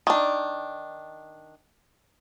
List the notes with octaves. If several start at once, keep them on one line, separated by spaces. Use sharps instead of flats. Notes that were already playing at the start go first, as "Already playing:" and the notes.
D#3 D4